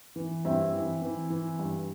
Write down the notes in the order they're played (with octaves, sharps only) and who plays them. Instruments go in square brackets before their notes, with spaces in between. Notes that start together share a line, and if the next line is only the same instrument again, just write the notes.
[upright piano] E3
G2 C4 E4
E3
E3
E3
G2